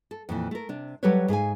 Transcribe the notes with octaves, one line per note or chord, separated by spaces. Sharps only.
A4
F2 A#2 E3
A3 A#4
C3 D4
F#3 G3 G4 A4 B4 C#5
G#2 G#4 F5 G#5